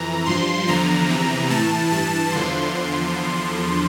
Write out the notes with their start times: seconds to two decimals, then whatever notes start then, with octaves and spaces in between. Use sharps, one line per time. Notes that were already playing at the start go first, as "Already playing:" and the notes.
Already playing: F2 E3 A#5
0.26 G2 F3 C6
0.67 E2 D3 F3 A#5
1.08 E2 C3 E3
1.50 A2 E3 A5
1.91 G2 E3 A5
2.32 E2 D3 F3 C6